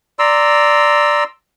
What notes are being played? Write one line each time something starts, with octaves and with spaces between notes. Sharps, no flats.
D5 A#5 C6 E6